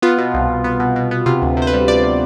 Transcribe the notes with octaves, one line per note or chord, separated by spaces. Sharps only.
B3 F4
B2
C2
C2
B3
B2
B2
B3
C3 F4
D2
C3 C5
B4
G3
C3 D5
C3